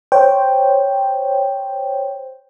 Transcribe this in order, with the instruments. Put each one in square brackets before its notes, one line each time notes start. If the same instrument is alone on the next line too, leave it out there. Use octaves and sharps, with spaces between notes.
[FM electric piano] C5 C#5 G5